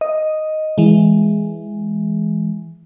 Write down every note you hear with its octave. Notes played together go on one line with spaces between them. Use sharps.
D#5
E3 G#3